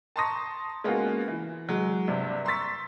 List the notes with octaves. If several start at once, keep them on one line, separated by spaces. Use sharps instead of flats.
A5 A#5 C6 C#6 D#6 A#6
G#3 A#3 B3 C#4 F4 F#4
E3
F#3 G#3
G2 C3
A#5 C6 C#6 E6 A6 B6